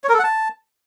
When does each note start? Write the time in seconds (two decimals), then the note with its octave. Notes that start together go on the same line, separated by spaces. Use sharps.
0.04 C#5
0.09 A#4
0.14 A4
0.19 F#5
0.24 A5